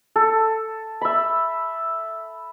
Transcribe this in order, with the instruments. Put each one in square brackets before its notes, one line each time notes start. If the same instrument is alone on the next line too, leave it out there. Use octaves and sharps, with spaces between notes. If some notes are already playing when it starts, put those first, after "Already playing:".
[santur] A4
E5 B5